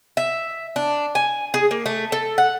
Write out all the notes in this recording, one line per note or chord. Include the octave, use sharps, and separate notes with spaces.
E5
D4
G#5
G#4
A#3
A3
A4
F#5